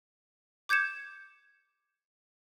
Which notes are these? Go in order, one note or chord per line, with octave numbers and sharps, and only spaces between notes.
D6 G6 G#6 C#7 E7